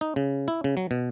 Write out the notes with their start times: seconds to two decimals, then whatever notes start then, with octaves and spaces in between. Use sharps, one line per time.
0.01 D#4
0.16 C#3
0.48 E4
0.64 C#3
0.77 F#3
0.91 B2